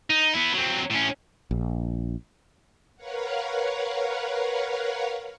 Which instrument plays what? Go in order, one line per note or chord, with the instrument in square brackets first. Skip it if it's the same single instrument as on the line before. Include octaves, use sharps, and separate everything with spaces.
[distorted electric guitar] D#4
B3 E4
F#3 C4
A2 C#4
[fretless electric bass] A#1
[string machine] A#4 B4 C#5 F5 F#5